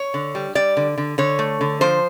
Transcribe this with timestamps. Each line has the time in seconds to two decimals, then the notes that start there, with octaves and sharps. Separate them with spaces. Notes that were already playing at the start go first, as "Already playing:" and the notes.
Already playing: C#5
0.14 D3
0.35 G3
0.55 G3 D5
0.77 D3
0.98 D3
1.18 D3 C#5
1.39 A3
1.61 D3
1.81 F3 C5